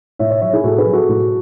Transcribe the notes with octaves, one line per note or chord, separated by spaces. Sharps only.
A2 C#5 E5
C#5 E5
F#3 C#5 E5
E4 G#4
A2 F#4 A4
G#4 B4
F#3
F#4 A4
A2